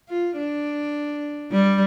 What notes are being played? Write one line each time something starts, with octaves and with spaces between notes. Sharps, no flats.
F4
D4
G3